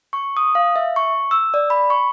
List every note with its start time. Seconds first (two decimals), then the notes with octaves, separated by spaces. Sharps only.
0.13 C#6
0.37 D#6
0.55 F5
0.76 E5
0.96 C#6
1.31 E6
1.54 D5
1.70 B5
1.90 C#6